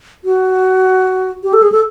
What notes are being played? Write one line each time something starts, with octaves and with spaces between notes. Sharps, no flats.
F#4
G4
A4
G#4
A4